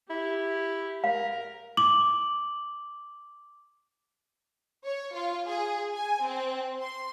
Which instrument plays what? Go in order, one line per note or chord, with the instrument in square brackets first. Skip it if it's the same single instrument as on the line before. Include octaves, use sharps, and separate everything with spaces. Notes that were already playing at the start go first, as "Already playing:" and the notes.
[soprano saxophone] E4 [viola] G4
[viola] A#4 [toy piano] F5
[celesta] D6 F#7
[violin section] C#5
F4
G#4
G#5
C4
C6